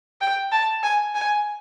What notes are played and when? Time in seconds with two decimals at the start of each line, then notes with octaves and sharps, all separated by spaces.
0.21 G5
0.52 A5
0.83 G#5
1.15 G#5